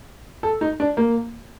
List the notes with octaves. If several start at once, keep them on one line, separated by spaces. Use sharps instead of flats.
A4
D#4
D4
A#3